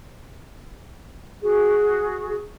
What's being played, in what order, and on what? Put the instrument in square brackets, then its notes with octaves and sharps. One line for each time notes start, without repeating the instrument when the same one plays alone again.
[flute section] F#4 G#4